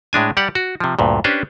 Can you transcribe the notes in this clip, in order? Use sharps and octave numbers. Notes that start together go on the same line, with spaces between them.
A2 G#3 D4 G#5
G3 G4 D5 F#5
F#4
C3 F3
D2 G2 A#2
C#4 D4 G4 B4 C5